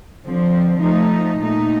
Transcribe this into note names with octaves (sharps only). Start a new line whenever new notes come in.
D3 F3 C4
F3 A3 D#4
A#2 A3 D#4